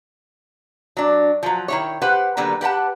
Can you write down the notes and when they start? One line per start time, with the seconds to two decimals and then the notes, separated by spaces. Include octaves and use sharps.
0.97 F#3 D4
1.43 F3 F#3
1.68 D#3 E4 C#5
2.02 G4 B4 C5 F#5
2.37 D3 F#3 G3 A#3 B3
2.61 G4 B4 F#5 A5